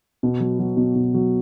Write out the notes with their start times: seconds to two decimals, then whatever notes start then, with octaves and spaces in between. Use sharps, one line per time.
0.23 B2
0.40 F#3
0.59 F#3
0.77 B2
0.95 B2
1.14 F#3